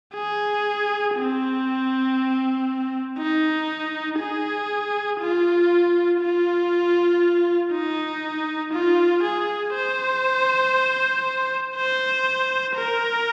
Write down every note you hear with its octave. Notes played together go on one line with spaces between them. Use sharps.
G#4
C4
D#4
G#4
F4
F4
D#4
F4
G#4
C5
C5
A#4